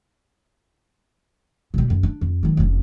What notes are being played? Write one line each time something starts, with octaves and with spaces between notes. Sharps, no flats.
B2 G3
F#2
D4
F2
D#3 F#3
F1 C#3